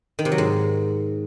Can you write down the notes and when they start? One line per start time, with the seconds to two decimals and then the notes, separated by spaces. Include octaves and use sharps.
0.19 D#3
0.25 C3
0.32 F#3
0.38 G#2